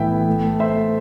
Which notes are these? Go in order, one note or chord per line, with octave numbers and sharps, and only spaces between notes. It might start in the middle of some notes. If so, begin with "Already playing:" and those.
Already playing: A2 E3 B3 E5 G5
B3
A3
A3
A3 C5 E5
A3